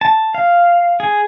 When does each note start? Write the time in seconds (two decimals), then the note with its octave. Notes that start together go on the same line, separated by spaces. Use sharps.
0.01 A5
0.35 F5
1.00 G#4